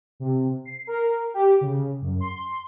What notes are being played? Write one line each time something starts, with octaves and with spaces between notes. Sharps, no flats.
C3
C7
A#4
G4
C#3
F#2
C6